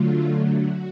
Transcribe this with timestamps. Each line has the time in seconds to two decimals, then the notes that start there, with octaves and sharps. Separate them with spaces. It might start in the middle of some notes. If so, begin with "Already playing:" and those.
Already playing: D3 F#3 A3 F4
0.60 F#4